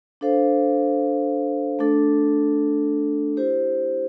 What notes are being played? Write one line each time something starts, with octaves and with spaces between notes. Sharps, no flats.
D4 A4 C5 F5
A3 D4 A4
E4 G4 C5